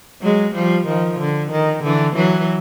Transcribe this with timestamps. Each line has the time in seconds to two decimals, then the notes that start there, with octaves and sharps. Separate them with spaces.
0.22 F#3 G#3
0.54 F3 G3
0.87 D#3 F3
1.20 D3
1.51 D#3
1.84 D3 E3
2.16 E3 F#3